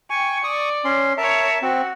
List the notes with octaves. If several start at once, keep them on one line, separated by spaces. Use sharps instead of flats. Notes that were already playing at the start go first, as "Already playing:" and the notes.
G5 G#5 C#6
D5 C#6 D#6
C#4 C6
A#4 C#5 E5 A5
C4 F#4